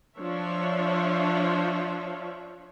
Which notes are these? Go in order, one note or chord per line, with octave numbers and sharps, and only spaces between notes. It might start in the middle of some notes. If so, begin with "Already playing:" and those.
F3 D4 C#5 E5